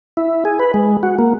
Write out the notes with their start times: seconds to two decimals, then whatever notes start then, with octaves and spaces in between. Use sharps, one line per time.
0.17 E4
0.45 G#4
0.59 B4
0.74 G#3
1.03 F#4
1.19 A#3